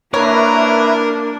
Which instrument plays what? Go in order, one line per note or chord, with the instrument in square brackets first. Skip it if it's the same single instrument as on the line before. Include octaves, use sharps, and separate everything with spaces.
[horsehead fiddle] A#3 D4 [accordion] E4 B4 [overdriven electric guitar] A#4 [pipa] C#5